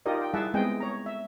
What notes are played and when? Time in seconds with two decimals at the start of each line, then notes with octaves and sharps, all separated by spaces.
0.06 D#4 F4 G4 A#4 D5 D#5
0.21 G5
0.34 G3 E4 G#4 E5 F#5 A5
0.54 G#3 B3 C4 G#4 D#5 G5
0.80 C#5 A#5
1.06 E5